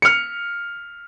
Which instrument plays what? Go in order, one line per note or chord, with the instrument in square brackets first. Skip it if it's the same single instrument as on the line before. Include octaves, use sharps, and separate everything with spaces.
[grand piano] F6 C#7